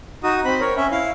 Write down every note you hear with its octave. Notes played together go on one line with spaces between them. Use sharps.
D#4 F#4 D#6
C4 B5
A#4 C#5
C#4 E5
E4 F5